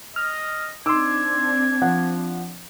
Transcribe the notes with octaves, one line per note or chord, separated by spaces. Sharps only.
D#5 F6
C4 D4 D#4 C6 D6 E6 G#6
F3 F#5